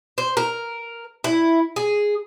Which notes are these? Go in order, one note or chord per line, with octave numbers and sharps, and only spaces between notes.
C5
A#4
E4
G#4